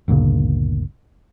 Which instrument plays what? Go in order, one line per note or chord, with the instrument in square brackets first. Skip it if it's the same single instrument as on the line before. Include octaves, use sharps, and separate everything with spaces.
[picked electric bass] G1 D2 A#2 C#3